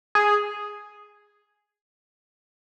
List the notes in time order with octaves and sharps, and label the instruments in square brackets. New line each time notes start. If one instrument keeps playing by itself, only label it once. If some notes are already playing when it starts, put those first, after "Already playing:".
[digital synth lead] G#4